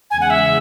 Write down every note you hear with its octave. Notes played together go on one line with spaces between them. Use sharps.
E2 C#3 G#3 G#5
F#5
E5